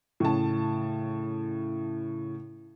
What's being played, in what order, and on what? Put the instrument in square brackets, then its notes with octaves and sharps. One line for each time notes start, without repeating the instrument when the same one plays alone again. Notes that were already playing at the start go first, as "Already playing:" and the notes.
[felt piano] A2 C#3 A5